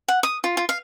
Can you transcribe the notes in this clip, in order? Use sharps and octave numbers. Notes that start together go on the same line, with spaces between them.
F#5
D#6
F4
F4
F5